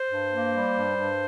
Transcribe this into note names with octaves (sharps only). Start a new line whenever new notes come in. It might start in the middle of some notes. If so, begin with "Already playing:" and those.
Already playing: C5
G2
A#3
G3
G2
G2